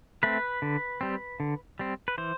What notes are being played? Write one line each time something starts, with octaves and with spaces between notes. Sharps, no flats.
A3 C4 B4
D3
G3 C4
D3
G3 C4
B4
E3 C5